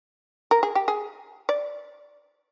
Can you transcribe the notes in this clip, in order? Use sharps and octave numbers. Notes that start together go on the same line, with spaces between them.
A#4
G#4
G4
G#4
D5